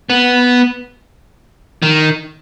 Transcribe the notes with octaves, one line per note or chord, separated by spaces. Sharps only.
B3
D#3